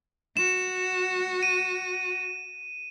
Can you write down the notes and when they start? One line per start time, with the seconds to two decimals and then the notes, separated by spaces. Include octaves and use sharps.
0.37 F#4 E7
1.43 D#7